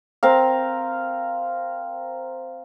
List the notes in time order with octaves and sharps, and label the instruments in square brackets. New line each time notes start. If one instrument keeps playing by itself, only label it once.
[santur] C4 A#4 F5